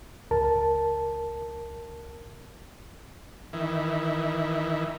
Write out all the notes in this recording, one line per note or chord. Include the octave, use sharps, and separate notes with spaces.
C#2 A#4 A5
D#3 E3